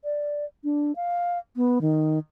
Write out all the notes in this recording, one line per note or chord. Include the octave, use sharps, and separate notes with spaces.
D5
D4
F5
B3
D#3